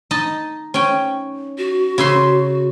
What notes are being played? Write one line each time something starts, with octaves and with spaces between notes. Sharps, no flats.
D#4 D#5 A5
C#4 G5
F#4
C#3 E5 C6